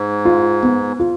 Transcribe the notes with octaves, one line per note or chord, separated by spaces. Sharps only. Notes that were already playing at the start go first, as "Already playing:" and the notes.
Already playing: G#2
F4
B3
F4